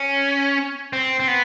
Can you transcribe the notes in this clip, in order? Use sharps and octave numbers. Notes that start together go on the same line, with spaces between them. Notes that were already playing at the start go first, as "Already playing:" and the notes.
Already playing: C#4
C4
C4
B3